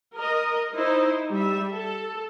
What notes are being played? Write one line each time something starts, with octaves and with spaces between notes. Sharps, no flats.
A#4 D#5
D#4 E4 C5
G3 E5
A4